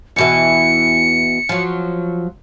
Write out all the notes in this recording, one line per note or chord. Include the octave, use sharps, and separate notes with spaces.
E2 B2 E3 C#7
F3 F#3